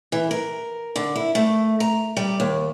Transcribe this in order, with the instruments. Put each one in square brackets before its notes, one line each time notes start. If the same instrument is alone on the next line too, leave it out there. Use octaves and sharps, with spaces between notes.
[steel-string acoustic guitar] E3
A#4
D3
E4
A3
A#5
G3
D#2